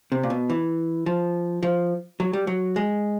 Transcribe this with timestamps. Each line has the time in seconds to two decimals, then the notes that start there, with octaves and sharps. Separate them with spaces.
0.12 C3
0.23 A#2
0.30 B2
0.50 E3
1.06 F3
1.63 F3
2.20 F#3
2.33 G3
2.47 F#3
2.76 G#3